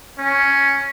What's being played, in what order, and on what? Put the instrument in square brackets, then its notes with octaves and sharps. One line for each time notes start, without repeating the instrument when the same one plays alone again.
[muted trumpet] C#4